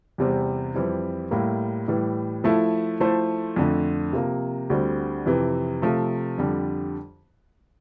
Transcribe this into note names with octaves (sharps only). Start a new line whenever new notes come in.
E2 C3 G3 C4
F2 E3 G3 C4 E4
A2 G3 A#3 E4
A2 E3 G3
F3 A3 E4
F3 A3 E4 A4 C5
F2 D3 A3
C3 F3 A#3
D2 D3 G3 C4
F2 C3 E3
C3 F3 A3
F2 D3 G3